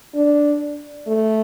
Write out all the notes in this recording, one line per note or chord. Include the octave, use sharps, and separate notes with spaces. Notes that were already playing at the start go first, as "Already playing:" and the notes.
D4
A3